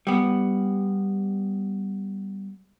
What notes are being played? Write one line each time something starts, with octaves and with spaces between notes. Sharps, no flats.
G3 B3